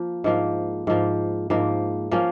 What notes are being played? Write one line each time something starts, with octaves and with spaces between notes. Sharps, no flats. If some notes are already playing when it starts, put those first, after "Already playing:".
Already playing: F3 A#3
G#2 F3 A#3
G#2 F3 A#3
G#2 F3 A#3
F3 A#3 C#4